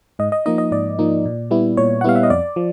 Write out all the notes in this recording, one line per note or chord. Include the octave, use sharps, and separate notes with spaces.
G#2 D#5
D#5
F3 A#3 D#4 D#5
D#5
G#2 D5
F3 A#3 D#4
A#2
G3 B3 E4
A#2 C#5
F#5
G3 B3 E4 F5
E5
D#5
F2 D5
F3